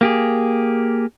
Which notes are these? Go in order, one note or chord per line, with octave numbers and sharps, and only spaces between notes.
A#3 G4 G#4